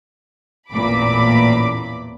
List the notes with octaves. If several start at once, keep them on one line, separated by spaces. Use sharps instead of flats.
A1 E2 A#2 B5 D6